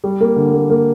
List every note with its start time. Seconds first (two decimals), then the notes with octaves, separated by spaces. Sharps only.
0.04 G3
0.21 A#3
0.36 D3
0.53 A#3
0.70 A#3